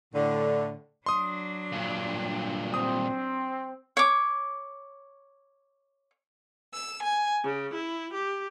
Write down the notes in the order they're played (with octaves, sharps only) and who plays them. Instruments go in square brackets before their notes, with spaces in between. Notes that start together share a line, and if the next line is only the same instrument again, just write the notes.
[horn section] A2 D3
[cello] F#3 D4 [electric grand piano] C6 D#6
[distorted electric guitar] G2 A#2
[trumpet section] C4 [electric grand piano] D#6
[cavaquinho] C#5 D6
[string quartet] E6
G#5
C#3
E4
G4